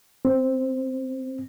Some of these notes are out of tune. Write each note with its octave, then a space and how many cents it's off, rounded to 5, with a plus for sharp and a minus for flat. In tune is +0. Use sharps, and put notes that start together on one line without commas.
C4 +0